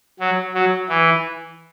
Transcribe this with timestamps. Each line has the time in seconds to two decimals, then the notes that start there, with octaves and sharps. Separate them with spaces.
0.20 F#3
0.54 F#3
0.89 E3